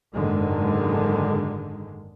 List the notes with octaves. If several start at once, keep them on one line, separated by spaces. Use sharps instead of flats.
F#1 G#2 D3 D#3 G#3